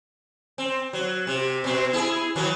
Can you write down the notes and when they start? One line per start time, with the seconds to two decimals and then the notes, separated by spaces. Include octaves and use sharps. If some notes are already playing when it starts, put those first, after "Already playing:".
0.58 C4
0.93 F#3
1.27 C3
1.64 B2 C4
1.93 E4 G#4
2.36 D#3 E3 F#3